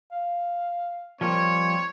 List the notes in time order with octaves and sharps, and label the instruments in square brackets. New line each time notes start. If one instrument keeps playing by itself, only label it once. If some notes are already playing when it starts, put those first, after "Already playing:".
[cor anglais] F5
[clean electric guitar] F3 G3 A#3 [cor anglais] C4 [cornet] C#5